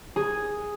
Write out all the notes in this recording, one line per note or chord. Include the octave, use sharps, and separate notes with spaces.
G#4